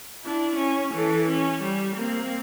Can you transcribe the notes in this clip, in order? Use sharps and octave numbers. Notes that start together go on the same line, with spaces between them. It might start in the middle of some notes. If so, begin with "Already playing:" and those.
D4 E4
C#4
E3 A4
C#4
G3
A#3 C4